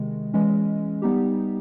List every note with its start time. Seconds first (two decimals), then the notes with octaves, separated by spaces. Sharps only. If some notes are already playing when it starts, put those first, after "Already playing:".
Already playing: C3 D#3 G#3
0.34 E3 G#3 C#4
1.02 G3 B3 D#4 G4